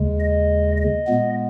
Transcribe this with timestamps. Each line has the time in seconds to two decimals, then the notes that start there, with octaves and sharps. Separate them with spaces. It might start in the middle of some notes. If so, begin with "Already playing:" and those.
Already playing: D#2 C#3 G#3
0.20 D#5
0.77 D#5
1.07 A#2 G#3 B3